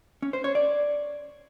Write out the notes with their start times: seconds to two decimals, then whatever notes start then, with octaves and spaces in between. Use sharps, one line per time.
0.22 C#4
0.33 C5
0.44 C#5
0.55 D5